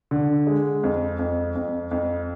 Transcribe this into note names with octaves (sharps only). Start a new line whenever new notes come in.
D3
G#3
F2
F2
F2
F2